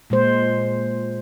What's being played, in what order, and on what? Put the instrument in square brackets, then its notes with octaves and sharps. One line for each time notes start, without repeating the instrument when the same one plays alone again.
[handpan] A#2 G#3 C5